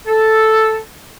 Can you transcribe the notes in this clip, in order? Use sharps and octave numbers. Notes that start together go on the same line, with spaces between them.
A4